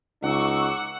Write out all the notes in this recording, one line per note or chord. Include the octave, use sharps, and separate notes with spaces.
C#2 D#4 F#5 C#6 D6 E6